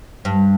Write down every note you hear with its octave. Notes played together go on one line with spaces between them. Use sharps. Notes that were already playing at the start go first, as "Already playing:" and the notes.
G2